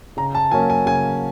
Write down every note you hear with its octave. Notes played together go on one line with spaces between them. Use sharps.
C#3 A#5
A5
F#3 A#3 C#4 G#5
G#5
C#3 G#5